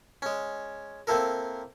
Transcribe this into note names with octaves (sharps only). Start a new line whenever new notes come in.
G#3 C#4
A#3 C4 E4 A4 A#4